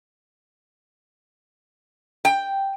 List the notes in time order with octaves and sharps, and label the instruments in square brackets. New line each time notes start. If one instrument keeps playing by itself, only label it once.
[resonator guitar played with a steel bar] G5